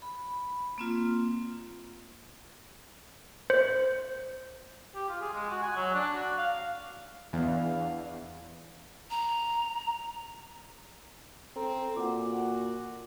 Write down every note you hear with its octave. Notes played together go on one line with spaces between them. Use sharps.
B5
A#3 C4 F4
C5
G4
F4
G#4
G#3
F#4
G#5
F#3
D4
F#4
F5
E2 B3 D4 F5
A#5
C4 A4 A#5
A#2 F#4 F#5 D6